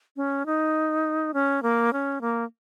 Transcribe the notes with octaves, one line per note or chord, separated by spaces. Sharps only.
C#4
D#4
C#4
A#3
C#4
A#3